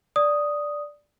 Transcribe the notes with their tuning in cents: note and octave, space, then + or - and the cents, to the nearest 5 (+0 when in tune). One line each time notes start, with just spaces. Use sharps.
D5 +0 D#6 +0